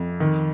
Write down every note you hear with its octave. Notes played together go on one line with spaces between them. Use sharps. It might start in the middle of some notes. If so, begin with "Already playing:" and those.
Already playing: F2
D#3